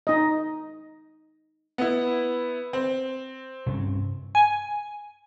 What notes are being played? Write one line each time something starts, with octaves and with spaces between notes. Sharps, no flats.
D#4 D#5
B3 E4
C4
G2 C3 C#4
G#5